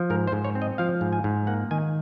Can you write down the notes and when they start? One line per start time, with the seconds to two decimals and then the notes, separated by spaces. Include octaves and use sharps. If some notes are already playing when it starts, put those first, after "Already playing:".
Already playing: F3
0.10 G#2 A#4
0.28 C5
0.32 G#2
0.44 C#5
0.55 C4
0.62 D#5
0.78 F3 F5
1.01 G#2
1.13 G#5
1.24 G#2
1.47 A#3 F#5
1.71 D#3 G#5